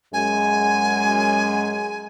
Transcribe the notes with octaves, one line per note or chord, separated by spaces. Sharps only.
F#2 G#3 G#5